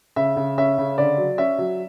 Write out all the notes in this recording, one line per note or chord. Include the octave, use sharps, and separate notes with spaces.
C#3 E5
C#3
C#4 E5
C#3
D3 D5
F#3
C#4 E5
F#3